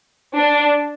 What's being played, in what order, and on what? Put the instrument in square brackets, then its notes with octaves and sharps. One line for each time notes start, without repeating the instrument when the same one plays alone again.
[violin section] D4